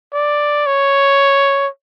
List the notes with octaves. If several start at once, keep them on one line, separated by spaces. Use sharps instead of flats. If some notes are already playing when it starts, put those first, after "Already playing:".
D5
C#5